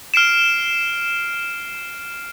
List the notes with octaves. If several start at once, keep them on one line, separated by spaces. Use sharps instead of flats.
F6 C7 D7 E7